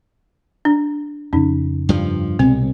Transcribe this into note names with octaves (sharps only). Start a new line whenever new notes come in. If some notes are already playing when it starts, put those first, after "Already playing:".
D4
F2 C#3 C#4 D#4
G2 F3
C2 B2 G#3 B3 C4